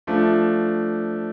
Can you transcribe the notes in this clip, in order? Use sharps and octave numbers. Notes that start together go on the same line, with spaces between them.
F3 A3 D4